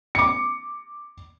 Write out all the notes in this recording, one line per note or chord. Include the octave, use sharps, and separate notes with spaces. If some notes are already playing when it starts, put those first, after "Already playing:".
D6 C#7